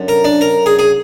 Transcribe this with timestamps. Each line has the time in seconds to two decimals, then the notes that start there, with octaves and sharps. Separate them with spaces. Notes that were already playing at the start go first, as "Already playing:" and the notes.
Already playing: F#2 D3
0.08 A#4
0.25 D4
0.41 A#4
0.66 G#4
0.79 G#4